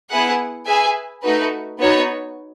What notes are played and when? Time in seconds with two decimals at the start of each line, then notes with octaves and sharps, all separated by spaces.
0.10 B3 E4 G#4 B4 F#5
0.67 G#4 B4 E5 G#5
1.22 A3 D#4 F#4 B4
1.80 B3 D#4 F#4 C#5